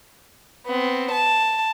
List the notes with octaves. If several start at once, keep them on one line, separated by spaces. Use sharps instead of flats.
B3 C4
A5